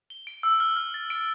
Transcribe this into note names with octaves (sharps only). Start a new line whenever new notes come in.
G7
D7
E6
F6
F6
A6
D7